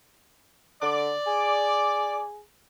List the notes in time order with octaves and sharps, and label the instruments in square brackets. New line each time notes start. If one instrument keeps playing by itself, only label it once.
[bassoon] D3 [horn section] D5
[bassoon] G#4